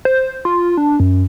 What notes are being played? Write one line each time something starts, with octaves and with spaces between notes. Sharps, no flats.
C5
F4
D4
F#2